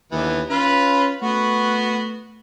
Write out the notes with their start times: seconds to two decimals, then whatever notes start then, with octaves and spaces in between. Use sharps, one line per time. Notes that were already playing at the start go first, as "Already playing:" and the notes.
0.12 D#2 D3 E3 B3
0.50 C#4 F4 B4 B5
1.22 A3 B3 F#4